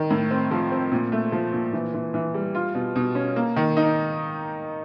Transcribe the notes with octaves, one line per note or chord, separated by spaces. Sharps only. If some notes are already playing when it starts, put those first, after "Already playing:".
Already playing: D#3
A2
C4
F3
C4
A#2
A3
F3
A#2
E3
E3
E3
G3
F4
B2
B2
C#4
A#3
D#3
D#4